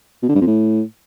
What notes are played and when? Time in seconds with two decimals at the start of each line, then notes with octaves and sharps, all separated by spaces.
0.23 B2
0.29 D3
0.35 G2
0.41 F2
0.47 A2